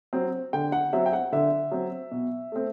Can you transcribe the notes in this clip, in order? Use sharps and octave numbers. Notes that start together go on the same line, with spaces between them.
F#3 C4
D3 G5
F#5
F#3 C4 E5
G5
F#5
D3 E5
F#3 C4
B2
A3 C4